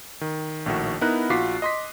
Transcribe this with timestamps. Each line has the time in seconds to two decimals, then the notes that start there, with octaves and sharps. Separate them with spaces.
0.21 D#3
0.66 A#1 A2 D#3 F#4
1.01 B3 D#4 E4 A#4 B5 F#6
1.30 A#1 F4 F#4 D6 B6 C7
1.62 D#5 C6 B6